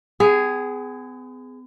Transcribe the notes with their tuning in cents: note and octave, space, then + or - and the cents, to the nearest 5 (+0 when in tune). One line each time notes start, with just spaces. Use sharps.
B3 +45 G#4 +0